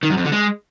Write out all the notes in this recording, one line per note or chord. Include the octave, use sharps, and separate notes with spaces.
D#3
F#2
F2
D3
G#3